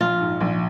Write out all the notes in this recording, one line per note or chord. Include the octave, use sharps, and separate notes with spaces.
A#1 F4
G#2
A#1